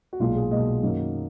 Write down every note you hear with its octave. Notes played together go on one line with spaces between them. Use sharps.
F#4
B1 A#2 G#3 F4
G#4
B1 A#2 G#3 D#5
F#2 D#3 F#3 A#3